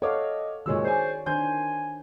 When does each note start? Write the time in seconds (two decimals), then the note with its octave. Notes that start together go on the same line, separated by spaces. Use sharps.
0.02 A4 C#5 D#5 F5 F#5 D6
0.66 A#2 D#3 G#3 F#4 C#5 E6
0.84 G#4 C5 D5 G#5
1.26 D#3 D4 C5 G#5 C6 G6